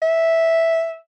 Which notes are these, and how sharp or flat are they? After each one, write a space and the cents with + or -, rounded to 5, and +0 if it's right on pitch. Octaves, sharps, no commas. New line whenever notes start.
E5 -5